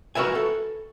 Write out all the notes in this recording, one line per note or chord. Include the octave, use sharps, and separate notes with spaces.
F#4 A#4 B4 E5 G#5
A4